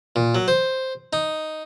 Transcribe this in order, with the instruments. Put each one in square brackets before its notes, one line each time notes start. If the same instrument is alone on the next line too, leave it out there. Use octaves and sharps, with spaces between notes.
[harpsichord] A#2
F#3
C5
D#4